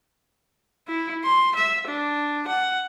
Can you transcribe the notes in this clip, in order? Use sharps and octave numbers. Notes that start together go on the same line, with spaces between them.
E4
C6
E5
D4
F#5